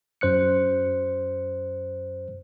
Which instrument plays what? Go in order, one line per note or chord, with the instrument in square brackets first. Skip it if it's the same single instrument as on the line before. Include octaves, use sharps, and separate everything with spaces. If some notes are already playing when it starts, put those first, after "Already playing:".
[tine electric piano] F#2 C5 F#6 C#7